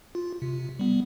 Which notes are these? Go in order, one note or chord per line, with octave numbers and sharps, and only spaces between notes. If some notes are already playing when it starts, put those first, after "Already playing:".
F4
C3
G3 B3